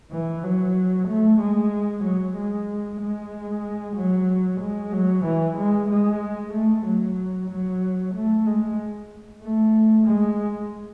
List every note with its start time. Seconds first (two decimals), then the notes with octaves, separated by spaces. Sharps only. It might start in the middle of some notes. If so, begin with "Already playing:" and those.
0.12 E3
0.44 F#3
1.08 A3
1.41 G#3
2.04 F#3
2.37 G#3
3.01 G#3
3.96 F#3
4.60 G#3
4.92 F#3
5.25 E3
5.58 G#3
5.90 G#3
6.53 A3
6.85 F#3
7.50 F#3
8.14 A3
8.46 G#3
9.42 A3
10.07 G#3